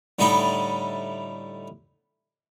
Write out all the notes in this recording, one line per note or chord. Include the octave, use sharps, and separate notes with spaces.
A2 D3 G3 D#4 E4 A4